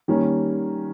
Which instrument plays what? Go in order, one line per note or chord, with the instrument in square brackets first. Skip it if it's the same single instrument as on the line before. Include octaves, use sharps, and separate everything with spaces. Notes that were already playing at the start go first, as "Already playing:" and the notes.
[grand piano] D#3 G3 A#3 C#4